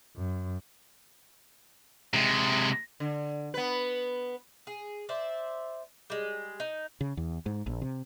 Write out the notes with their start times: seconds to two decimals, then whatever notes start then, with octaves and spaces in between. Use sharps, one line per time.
0.17 F#2
2.14 C3 G#3
3.00 D3
3.54 B3 B4
4.67 G#4
5.09 C5 D5 E5
6.10 G3 G#3
6.60 D#4
7.01 C#3
7.17 E2
7.46 G#2
7.66 A#1
7.82 C3